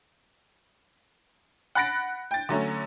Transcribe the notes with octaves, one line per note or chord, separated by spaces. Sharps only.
F#5 B5 F#6 A6 A#6 D7
G5 A6
D3 F#3 A3 C#4